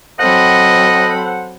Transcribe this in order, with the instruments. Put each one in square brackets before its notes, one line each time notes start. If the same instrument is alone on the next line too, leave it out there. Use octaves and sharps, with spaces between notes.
[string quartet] F#3 C4 B5 [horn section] A4 C5 F#5 [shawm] D#5